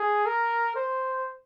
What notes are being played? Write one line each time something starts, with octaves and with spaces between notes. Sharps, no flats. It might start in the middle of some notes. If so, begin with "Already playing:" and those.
Already playing: G#4
A#4
C5